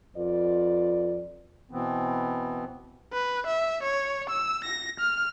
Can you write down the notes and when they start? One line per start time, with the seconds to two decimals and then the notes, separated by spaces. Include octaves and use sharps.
0.16 F2 F4 B4 D5
1.71 B2 E3 B3 C4
3.13 B4
3.47 E5
3.83 C#5
4.29 E6
4.64 A#6
4.99 F6